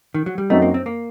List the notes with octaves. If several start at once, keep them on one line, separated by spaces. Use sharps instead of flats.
D#3
F#3
G3
F#2 F#3 A3 C4 D#4
A#3
C4
A#3